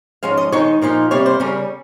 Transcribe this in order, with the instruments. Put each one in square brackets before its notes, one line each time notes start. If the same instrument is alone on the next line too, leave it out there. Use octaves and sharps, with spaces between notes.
[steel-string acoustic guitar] G#2 F3 G#3 C#4 F5
D#5
D#3 G#3 D#4 C#5
A#2 F3 A#3 D#4
C3 G3 A#3 C#5
C5
C#3 G3 C#4 A#4